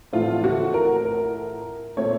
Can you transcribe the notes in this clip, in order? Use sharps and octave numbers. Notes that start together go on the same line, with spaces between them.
A1 A2 F3 A3 C4 F4
F#4
A#4
A#4
A#2 A3 C4 C#5